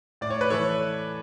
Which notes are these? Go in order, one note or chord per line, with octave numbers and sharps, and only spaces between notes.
A2 D5
C#5
B4
E3 A4 C#5